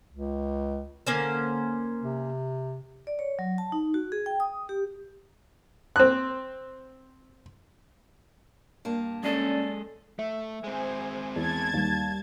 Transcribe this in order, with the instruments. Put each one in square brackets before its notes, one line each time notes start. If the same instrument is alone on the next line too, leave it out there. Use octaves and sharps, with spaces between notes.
[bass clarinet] C#2
[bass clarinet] D3 [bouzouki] A#3 C#4 C5
[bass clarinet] C3
[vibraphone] D5
C#5
F#3
A5
D#4
F#4
G#4
G5
D#6
G4
[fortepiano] C4 F#6
[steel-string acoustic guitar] G2 A#3 A5
[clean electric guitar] G#3 G#4 A4 [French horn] C#4 [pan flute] D5
[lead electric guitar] A3 [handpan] E5
[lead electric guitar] G#3 C4 [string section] G#4 C5
[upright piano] E2 [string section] A5 G#6 A6
[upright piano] D#2 [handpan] G3 G4